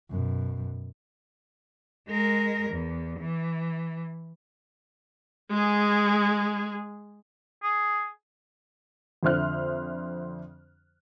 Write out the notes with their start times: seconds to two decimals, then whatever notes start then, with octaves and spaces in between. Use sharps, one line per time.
0.10 F#2 B2
2.08 G#3 A#4
2.70 E2
3.19 E3
5.50 G#3 G#4
7.63 G#4
9.23 F2 D3 C5 E5 F6 F#6